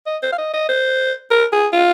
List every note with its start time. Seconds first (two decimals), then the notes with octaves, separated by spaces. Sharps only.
0.07 D#5
0.23 C5
0.32 F5
0.38 D#5
0.53 D#5
0.69 C5
1.31 A#4
1.53 G#4
1.73 F4